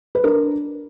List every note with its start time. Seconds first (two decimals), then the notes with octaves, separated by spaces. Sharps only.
0.15 B4
0.24 D4 A#4